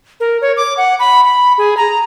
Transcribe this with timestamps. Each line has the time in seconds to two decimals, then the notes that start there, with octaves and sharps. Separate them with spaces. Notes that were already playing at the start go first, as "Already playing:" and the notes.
0.20 A#4
0.42 C#5
0.57 D6
0.77 F#5
0.99 B5
1.24 B5
1.58 G#4
1.77 A#5